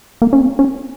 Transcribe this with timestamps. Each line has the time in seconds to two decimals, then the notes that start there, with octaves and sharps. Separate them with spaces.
0.22 A#3
0.33 C#4
0.41 C4
0.59 C#4